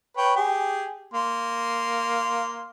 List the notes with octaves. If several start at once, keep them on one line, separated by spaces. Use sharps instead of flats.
B4 C#5 G5
G4 G#4
A#3 C6